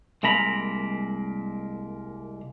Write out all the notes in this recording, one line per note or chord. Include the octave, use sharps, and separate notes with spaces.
C2 G#3 A#3 A#5 B5